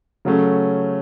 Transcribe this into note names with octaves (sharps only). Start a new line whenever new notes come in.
C#3 F#3 A3 C#4